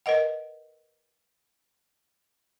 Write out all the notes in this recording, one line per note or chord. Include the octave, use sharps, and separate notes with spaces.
A#4 B4 D#5 F#5